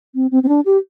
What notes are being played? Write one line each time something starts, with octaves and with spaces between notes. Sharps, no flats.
C4
C4
C4
D4
G4